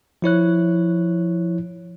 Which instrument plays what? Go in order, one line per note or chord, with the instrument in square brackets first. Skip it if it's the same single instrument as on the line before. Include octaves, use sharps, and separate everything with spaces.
[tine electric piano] F3 E4 C#5 F#6